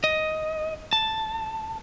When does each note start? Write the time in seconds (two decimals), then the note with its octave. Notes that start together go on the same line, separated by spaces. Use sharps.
0.04 D#5
0.93 A5